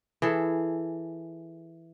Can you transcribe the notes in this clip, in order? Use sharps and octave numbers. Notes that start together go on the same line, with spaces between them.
E3 G#4 A4